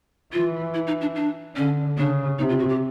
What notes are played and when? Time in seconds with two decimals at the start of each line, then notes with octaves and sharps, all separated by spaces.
0.33 E3 F4
0.74 E4
0.87 D#4
1.01 D4
1.16 D4
1.56 D3 C#4
1.97 C#3 D4
2.39 C3 D#4
2.49 F4
2.59 F#4
2.69 G4